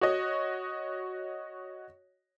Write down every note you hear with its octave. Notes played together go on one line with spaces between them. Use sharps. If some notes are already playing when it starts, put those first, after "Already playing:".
F#4 C#5 D#5